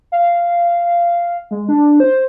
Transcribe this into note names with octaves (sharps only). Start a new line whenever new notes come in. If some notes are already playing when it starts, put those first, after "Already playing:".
F5
G#3
D4
C5